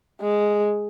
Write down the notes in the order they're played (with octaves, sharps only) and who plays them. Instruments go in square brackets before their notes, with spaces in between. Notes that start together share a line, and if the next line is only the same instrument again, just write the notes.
[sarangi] G#3